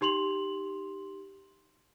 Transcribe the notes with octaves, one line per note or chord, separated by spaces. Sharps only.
D#4 G4 C6 F7 F#7